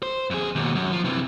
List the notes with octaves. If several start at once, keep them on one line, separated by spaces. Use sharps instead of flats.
C5
F2 G#4
D#2 B2
F#2
F3
C3 E3